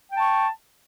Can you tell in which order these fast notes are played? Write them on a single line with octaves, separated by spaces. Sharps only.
G5 A5 C#6